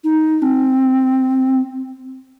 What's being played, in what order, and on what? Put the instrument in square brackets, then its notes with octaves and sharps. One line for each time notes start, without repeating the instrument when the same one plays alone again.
[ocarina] D#4
C4